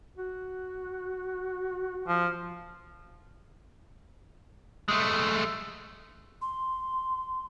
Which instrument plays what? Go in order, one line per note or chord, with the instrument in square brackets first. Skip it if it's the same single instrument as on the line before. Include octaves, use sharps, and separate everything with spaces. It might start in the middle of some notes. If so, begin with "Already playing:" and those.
[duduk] F#4
[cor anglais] F3
[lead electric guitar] G#3 A3
[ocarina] C6